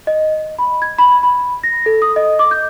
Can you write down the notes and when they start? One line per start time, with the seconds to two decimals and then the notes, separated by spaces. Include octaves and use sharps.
0.07 D#5
0.59 B5
0.82 G#6
0.99 B5
1.23 B5
1.64 A#6
1.86 A4
2.02 D#6
2.16 D#5
2.39 D6
2.51 G6